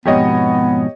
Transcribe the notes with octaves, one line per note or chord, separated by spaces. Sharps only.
F2 G#2 B2 B3 G4 C#5 D#5